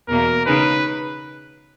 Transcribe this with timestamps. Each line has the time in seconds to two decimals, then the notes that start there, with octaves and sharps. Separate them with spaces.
0.08 E2 B2 A#3 A#4
0.46 C#3 G#3 D#4 B4